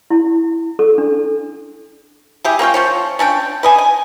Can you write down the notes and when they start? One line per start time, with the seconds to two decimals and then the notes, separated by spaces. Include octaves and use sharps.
0.10 E4
0.79 A4
0.98 D4
2.44 E4 G4 G#4
2.59 A#3 C#4 F4 G5
2.74 F3 C5 C#5
3.19 C#4 D4 F5 G5
3.63 B4 D#5 G#5
3.78 G#5